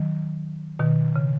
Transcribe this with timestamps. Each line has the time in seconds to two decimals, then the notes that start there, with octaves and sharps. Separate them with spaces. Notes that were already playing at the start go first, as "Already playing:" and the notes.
Already playing: D#3 F#3
0.79 B2 D#3
1.16 C#3